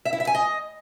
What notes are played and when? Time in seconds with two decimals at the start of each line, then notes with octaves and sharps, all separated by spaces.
0.05 E5
0.13 E4
0.20 E5
0.27 G#5
0.35 D#5